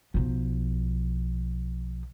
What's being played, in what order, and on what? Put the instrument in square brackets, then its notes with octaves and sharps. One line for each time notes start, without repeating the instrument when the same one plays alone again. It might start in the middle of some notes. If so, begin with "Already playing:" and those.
[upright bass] B1 F3